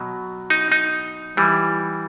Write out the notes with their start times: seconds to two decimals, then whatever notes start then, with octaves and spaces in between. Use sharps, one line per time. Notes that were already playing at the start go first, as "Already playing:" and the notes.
Already playing: B2 F#3
0.50 D#4
0.72 D#4
1.37 E3 G3